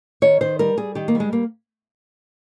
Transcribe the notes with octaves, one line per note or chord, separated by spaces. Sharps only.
D#3 C#5
D#3 C5
G3 A#4
G3 G#4
D#3 G4
A#3
G3
G#3
A#3